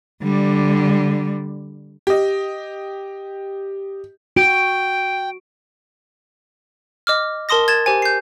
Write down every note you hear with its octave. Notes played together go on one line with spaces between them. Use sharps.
D3 G3
G4 D#5
F#4 G5 D7
D#5 D6 F6
A#4 A5 C6 D#6 A#6
G#6 A6 E7
G4 C5 G#5
G6 C7